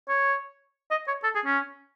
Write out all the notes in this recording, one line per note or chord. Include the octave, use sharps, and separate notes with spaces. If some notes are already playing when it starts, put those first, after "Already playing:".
C#5
D#5
C#5
A4
G#4
C#4